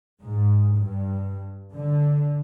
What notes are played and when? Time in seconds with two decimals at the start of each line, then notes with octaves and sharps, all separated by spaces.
0.23 G#2
0.77 G2
1.74 D3